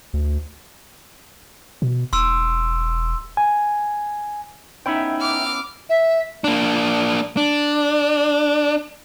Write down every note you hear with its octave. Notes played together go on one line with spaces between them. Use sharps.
D2
B2
E1 C6 E6
G#5
B3 C#4 D#4 E4 E5 G5
D6 F6
E5
A#3 D4
D4